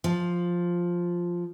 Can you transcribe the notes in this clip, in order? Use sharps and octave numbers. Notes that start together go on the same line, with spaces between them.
F3